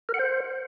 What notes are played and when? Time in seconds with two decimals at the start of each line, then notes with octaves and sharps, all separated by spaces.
0.09 A#4
0.14 F#5
0.19 C5